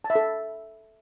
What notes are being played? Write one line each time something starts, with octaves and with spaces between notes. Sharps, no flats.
A5
E5
A4